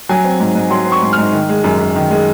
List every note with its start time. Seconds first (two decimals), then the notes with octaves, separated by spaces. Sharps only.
0.09 F#3 G#5
0.25 C4
0.40 G#2
0.55 G#2
0.70 F#3 C6
0.86 C4
0.92 C#6
1.02 G#2
1.13 F6
1.18 G#2
1.33 D#3
1.49 G#3
1.64 F#2
1.79 F#2
1.96 D#3
2.11 G#3